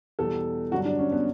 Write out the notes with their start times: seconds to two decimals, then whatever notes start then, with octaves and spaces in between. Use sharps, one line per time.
0.19 E2 B2 G3 A4
0.71 G2 D3 F#3 F#4
0.85 D4
0.98 C#4
1.12 B3